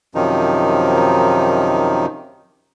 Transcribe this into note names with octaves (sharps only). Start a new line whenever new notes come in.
F#2 C3 D#3 F3 D#4